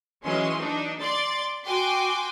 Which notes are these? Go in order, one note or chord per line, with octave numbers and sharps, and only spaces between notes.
E3 F#3 G#3 C#4 C6
D4 D#4
D5 C6 A6
F#4 G5 G#5 C6 D6